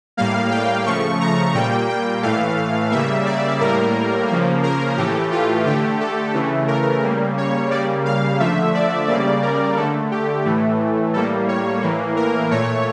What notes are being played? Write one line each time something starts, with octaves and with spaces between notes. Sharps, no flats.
A2 G3 A#3 F5
G5
C#3 F3 A3 C#6
A#5
A#2 G3 A#3 G5
G5
A2 E3 A3 F5
C#3 G3 A#3 E5
D5
A2 G3 A#3 A#4
C#3 F3 A#3
A#4
A2 E3 A3 G4
F4
D3 A3 G4
A4
C#3 E3 A3
A#4
C#3 G3 A#3
C#5
C#3 G3 A#3 D5
F5
D3 F3 A3 E5
D5
C#3 G3 A#3 D5
A#4
D3 A3 A4
G4
A2 E3 A3
A2 G3 A#3 A4
C#5
A2 E3 A#3
A#4
A#2 A3 C#5